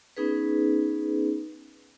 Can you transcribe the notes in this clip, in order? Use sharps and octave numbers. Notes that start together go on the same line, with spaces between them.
B3 C#4 D#4 G#4 B4